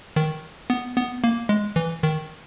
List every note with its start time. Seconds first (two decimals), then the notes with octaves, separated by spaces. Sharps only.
0.16 D#3
0.70 B3
0.96 B3
1.24 A#3
1.49 G#3
1.76 E3
2.03 D#3